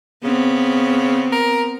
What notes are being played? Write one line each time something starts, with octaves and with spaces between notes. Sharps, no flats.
C#3 B3 C4
A#4